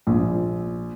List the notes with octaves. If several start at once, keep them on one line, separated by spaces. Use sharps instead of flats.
A#1